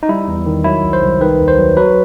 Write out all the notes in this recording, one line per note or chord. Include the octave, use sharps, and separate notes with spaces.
D#4
G3 E4
E2
D#3
F#3 E4
C2
C5
C2
D#3 B4
D#2
C5
F#3
F#3 B4